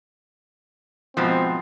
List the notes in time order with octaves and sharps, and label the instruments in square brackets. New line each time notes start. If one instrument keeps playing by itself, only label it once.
[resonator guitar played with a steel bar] G#2 B2 F3 [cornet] C4